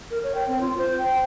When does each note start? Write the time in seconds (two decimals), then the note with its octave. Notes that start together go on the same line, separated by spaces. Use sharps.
0.11 A#4
0.23 C#5
0.35 G5
0.48 C4
0.61 F4
0.78 C5
0.98 G5